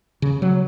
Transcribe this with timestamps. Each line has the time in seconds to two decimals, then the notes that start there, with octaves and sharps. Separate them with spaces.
0.22 C#3
0.42 F#3